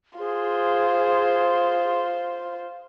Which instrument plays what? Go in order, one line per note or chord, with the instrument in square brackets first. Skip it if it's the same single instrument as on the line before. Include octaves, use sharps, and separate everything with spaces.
[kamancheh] F4 C5 [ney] G#4